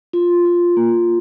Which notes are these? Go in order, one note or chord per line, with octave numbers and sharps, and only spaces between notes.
F4
F4
A#3